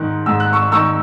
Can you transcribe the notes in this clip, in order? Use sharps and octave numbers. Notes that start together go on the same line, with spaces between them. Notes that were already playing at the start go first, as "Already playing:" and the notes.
Already playing: G#2 D#3 F#6
G#2 E6
F#6
C#6 E6
D#3 C#6 E6